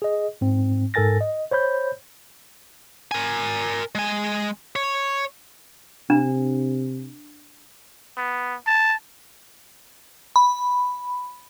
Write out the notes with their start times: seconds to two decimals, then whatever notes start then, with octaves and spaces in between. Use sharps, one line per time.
0.02 G#4 D#5
0.41 G#2 C4
0.94 G#2 A4 A#4 G#5 A6 A#6
1.21 D#5
1.51 C5 C#5 B5 G6
3.11 A#4 G#5
3.95 G#3 G#5
4.76 C#5
6.10 C3 D4
8.17 B3
8.67 A5
10.36 B5